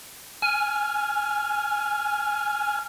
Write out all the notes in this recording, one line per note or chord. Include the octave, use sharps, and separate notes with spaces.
G#5 F6